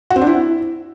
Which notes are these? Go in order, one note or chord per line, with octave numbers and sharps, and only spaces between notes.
F#4
C4
D4
E4